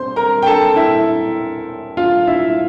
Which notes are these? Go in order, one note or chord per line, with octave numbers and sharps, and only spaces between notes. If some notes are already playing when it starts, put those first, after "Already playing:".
Already playing: C3 C5 C6
A#4 A#5
G5
A4 A5
E4 E5
F4 F5
E4 E5